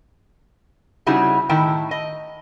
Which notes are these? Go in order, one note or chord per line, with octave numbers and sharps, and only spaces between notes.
C#3 G3 D#4 E4 F#4 G#4
A2 D#3 E4 G5 A5
D#5